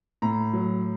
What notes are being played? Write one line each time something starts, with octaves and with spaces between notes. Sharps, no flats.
A2 A#5
F#3